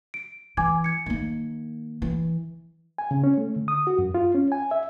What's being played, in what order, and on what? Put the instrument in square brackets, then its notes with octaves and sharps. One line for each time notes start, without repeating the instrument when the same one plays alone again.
[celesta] D7
[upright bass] E3 [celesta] G#5 D6 G#6
[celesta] G#6 C#7
[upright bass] D#3 A#3
E3
[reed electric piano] G#5
C#3
C#4
A3
D3
D#6
F#4
F#2
F4
C#4
G#5
E5